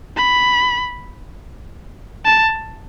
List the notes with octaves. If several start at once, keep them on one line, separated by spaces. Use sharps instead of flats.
B5
A5